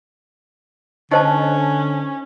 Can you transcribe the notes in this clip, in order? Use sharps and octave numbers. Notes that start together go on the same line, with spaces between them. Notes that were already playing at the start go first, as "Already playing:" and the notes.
D3 C#4 D#4 C5 C#5 D#5 A5 C#6